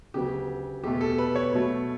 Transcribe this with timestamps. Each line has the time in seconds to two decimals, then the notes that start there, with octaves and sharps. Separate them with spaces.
0.14 D2 C#3 F#3 B3 G4
0.84 E2 B2 A3 G4
1.01 A4
1.18 B4
1.35 C#5
1.53 B2 F#3 A3